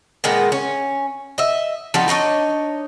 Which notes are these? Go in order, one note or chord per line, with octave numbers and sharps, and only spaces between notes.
A#2 D#3 G#3 B3
C#4
D#5 E5
F3 G3 B3 D#4
D4 D#4 C#5 D#5